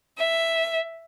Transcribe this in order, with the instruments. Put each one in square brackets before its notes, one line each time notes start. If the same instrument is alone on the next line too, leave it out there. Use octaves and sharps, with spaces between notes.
[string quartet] E5